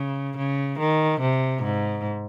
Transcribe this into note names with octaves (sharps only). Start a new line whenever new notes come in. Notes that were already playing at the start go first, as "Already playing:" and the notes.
Already playing: C#3
C#3
D#3
C3
G#2